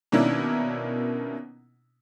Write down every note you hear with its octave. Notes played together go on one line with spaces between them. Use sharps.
B2 D#3 A#3 C#4 D4 E4